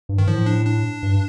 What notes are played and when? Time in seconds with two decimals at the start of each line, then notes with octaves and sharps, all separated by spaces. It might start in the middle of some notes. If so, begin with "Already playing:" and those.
0.09 G2
0.18 D#3
0.28 A2 F3
0.46 D4
0.65 D4
1.03 G2